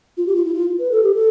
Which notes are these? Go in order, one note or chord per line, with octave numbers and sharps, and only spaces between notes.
F4
G4
F4
E4
F4
B4
A4
G4
A4